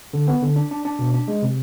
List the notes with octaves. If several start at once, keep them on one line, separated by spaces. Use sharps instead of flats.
D3
B3
D3
D4
D4
D4
B2
D4
G#3
C3